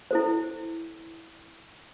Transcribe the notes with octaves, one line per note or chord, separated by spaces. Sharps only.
E4 A4 C5